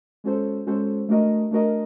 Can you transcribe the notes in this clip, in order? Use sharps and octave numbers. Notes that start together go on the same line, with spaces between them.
G#3 C#4 F#4 A4 C5
G#3 C#4 F#4 A4 C5
A3 D4 F#4 A#4 D#5
A3 D4 F#4 A#4 D#5